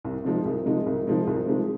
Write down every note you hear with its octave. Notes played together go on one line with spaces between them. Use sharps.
C2
C3 F3 G#3 D#4
C2
C3 F3 G#3 D#4
C2
C3 F3 G#3 D#4
C2
C3 F3 G#3 D#4